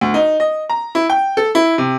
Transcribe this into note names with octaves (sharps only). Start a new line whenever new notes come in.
D2
D#4
D#5
A#5
E4
G5
A4
E4
C3